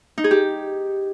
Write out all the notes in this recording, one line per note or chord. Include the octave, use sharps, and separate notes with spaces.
D#4
G#4
G4